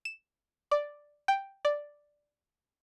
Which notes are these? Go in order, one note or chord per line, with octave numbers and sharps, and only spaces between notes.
E7
D5
G5
D5